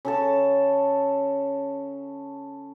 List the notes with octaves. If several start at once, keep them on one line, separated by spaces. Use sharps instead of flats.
C#3 A4 A5